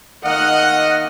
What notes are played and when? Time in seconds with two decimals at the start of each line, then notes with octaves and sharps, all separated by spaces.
0.25 D#3 A#3 D#5 F#5 F6